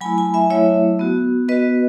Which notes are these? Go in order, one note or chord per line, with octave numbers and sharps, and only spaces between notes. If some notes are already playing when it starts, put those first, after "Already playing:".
F#3 A3 E4 G#5 B5
G#5 B5
E5 G#5
F#3 A3 E4 C#5 E5
B3 F#4
B3 F#4 B4 D#5